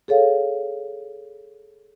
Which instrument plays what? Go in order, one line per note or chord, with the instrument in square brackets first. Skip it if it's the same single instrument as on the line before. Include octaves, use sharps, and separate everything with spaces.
[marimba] G#4 A4 C#5 F5